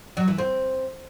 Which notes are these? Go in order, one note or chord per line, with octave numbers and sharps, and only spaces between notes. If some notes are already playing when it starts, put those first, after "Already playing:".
F#3
E3
C4